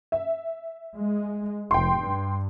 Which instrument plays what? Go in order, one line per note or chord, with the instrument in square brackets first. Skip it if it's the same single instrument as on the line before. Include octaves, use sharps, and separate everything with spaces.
[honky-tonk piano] E5
[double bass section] G#3
[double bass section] F1 [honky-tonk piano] G5 C6
[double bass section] G2